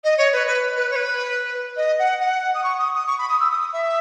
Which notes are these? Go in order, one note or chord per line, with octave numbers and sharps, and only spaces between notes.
D#5
C#5
B4
B4
B4
C#5
B4
D#5
F#5
F#5
D#6
C#6
D#6
D#6
C#6
B5
D#6
E6
D#6
E5